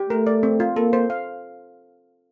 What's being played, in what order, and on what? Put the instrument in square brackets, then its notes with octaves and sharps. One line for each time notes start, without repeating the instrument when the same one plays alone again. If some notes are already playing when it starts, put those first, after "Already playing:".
Already playing: [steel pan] G4
[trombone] A3 [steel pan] A#4
[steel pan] D5
C4
F4
[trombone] A#3 [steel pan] A4
[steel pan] C5
F5